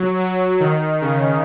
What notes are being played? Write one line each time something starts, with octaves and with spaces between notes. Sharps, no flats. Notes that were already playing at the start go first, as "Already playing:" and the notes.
Already playing: F#3
F#3
D#3
C#3